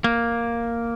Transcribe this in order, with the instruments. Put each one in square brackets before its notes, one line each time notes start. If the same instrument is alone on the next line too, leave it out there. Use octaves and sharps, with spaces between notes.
[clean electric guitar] A#3